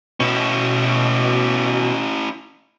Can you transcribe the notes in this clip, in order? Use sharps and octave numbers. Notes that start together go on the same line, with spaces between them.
B2 C#4 E4